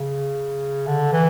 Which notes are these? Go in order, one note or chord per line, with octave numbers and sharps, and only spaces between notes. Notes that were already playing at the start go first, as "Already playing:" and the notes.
Already playing: C#3
D3
E3